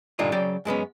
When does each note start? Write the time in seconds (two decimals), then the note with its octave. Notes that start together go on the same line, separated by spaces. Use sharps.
0.19 G2 A#2 D3 D#4 F4
0.32 C#3 F#3 D5 G5
0.65 F#2 G#3 B3 C#4